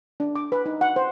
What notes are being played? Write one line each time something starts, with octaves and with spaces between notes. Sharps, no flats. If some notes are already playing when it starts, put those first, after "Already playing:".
D4
D6
B4
D#4
F#5
C5